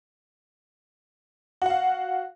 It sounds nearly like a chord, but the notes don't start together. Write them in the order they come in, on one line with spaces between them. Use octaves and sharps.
F#4 F#5 F5